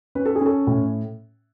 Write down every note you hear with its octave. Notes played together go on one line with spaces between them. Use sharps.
C#4 B4
A4
G#4
C#4 A4
A2